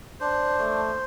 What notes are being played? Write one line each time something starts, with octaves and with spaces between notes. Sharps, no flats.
D4 C5
A3